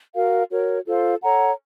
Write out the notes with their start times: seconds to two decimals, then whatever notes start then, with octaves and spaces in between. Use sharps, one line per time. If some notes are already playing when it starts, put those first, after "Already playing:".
0.14 F#4 A#4 F5
0.50 F#4 A#4 C#5
0.86 F4 A4 C5 F5
1.22 A4 C#5 F#5 A#5